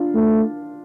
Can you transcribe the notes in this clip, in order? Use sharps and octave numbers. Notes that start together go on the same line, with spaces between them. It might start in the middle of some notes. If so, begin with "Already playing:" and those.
Already playing: D4 F4
A3